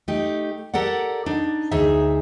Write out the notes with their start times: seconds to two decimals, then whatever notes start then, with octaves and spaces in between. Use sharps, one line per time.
0.08 A3 D#4 G4
0.74 G4 A4 A#4 D5 F#5
1.26 D4 D#4
1.71 D2 D#4 G#4 E5